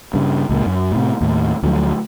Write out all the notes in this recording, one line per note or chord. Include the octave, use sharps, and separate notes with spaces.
G2 C#3
C#2 A#2 A#3
F#2
A2 C3
D#2 A2
D2 F3 F#3 A3